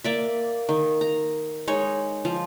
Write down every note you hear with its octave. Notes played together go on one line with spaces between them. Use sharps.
A#3 D5 E5
D#3
A#5
G#3 D#4 C#5
F3